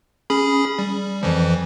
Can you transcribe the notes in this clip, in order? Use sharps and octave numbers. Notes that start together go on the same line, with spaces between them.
C#4 G#4 B5
G3
F2 E3 F3